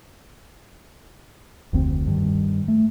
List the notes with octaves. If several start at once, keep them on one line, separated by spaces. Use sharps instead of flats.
F1 D2 C4
G2 D#3
A3